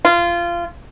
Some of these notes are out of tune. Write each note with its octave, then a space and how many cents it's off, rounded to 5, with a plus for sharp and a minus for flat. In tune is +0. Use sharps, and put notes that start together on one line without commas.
F4 -20